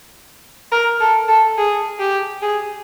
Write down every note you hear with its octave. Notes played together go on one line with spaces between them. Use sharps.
A#4
A4
A4
G#4
G4
G#4